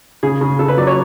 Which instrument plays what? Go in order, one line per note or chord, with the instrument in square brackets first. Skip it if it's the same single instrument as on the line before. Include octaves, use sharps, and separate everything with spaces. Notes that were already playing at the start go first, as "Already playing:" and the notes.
[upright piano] C#3 [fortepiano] G#4
[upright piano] C#3
[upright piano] C#3 [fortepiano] A4
[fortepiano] B4
[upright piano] F#3 [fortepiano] D5
[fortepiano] C#5